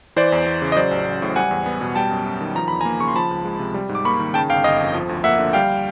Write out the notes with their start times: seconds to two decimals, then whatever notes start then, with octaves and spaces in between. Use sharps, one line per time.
0.16 E3 C5 D5
0.32 E2
0.47 E2
0.62 C#3
0.72 D#5
0.76 F#3 C5 D5
0.91 A1
1.06 A1
1.22 A2
1.36 G3 F#5 G#5
1.51 E2
1.66 B3
1.81 B2
1.95 G3 G5 A5
2.11 F#2
2.26 F#2
2.41 D#3
2.55 F3 A#5
2.68 E2 B5
2.81 A#3 G#5 A#5
3.00 C#3 C#6
3.08 C6
3.15 F3 A5 B5
3.31 C#2
3.45 G#3
3.59 C3
3.74 G3
3.89 G#2
3.95 D6
4.05 A#3 B5 C#6
4.20 D#3
4.34 C#3 G5 A5
4.49 G1 F5 G5
4.64 G1 D#5 F5
4.80 F2
4.94 F3
5.09 D2
5.24 A#3 E5 F#5
5.39 D3
5.53 G3 F5 G5